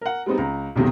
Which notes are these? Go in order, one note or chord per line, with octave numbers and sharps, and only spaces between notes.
A#4 F#5
G3 G#3 B3 C4 D#4
C#2 A#5
B1 E2 C3 D#3 G3